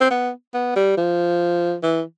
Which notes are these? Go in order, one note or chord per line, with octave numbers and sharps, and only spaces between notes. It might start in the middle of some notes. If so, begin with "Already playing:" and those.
C4
B3
B3
G3
F3
E3